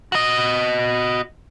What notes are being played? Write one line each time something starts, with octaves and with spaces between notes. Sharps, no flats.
F#4 D#5